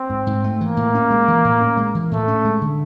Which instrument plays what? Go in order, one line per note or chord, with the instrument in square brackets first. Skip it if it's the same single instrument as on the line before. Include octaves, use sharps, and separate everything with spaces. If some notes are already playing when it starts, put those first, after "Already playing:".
Already playing: [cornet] C4
[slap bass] G#2
G#2
A3
[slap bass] E3 [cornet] A#3
[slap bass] A2
C#4
G#3
E3
A2
C#4
G#3
E3
[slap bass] A2 [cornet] A3
[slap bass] C#4
G#3
D3